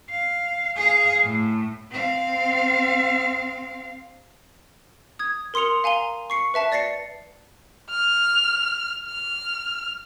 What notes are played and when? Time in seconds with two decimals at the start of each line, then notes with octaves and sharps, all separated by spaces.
0.10 F5
0.77 G#4 F5
1.24 A2
1.91 C4 F5
5.19 D#6 G#6
5.54 A#4 C6 D#6 C#7 F7
5.84 F5 G#5 A#5 G7
6.30 C#6 C7 C#7
6.54 B4 E5 A5 B6
6.72 D5 A6 A#6 C7 C#7
7.90 F6
9.07 F6